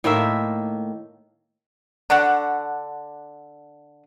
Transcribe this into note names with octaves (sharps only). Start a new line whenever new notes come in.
A2 D#3 A#3 E5
D3 D4 F#4 F#5